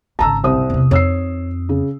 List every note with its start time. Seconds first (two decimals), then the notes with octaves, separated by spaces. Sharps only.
0.19 G#1 C#3 A5 A#5 E6
0.44 C2 C5 D#6
0.70 E2 C3
0.91 F2 D#4 C#5 E6 C7
1.69 C#3